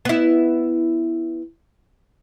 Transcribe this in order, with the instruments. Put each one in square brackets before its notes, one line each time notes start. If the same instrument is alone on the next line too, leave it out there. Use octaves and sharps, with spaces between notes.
[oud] B3 E4